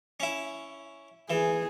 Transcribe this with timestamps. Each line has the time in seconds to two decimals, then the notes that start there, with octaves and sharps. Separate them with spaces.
0.20 C#4 E4
1.30 E3 G#4